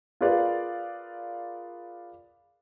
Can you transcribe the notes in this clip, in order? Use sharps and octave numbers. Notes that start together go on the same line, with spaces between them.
F4 G#4 A#4 B4 D5 F5